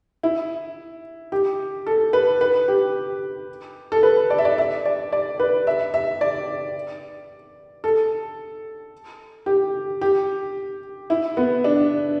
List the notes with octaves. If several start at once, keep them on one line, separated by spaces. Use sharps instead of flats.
E4
G4
A4
B4
B4
G4
A4
B4
D5
E5
D5
E5
D5
D5
B4
E5
E5
D5
A4
G4
G4
E4
B3
D4